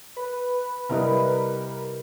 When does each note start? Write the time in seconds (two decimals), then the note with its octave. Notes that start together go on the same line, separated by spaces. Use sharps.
0.16 B4
0.89 C3 G3 E4 A#4 D#5